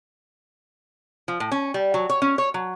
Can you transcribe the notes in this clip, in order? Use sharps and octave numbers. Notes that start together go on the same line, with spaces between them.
F3
A2
C#4
G3
F#3
C#5
C#4
C#5
F#3